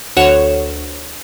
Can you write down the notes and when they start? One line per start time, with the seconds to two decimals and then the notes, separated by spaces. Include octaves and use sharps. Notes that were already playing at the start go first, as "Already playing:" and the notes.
0.17 D2 C#5 F#5 E7